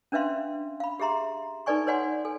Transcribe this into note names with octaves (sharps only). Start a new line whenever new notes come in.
C#4 D4 B4 E5 F5 C6
F5 B5
G4 G#4 E5 A#5 C6
D#4 A4 B4 D5 G#5 C#6
B4 C#5 D5 F#5 G#5 C6
A4 G#5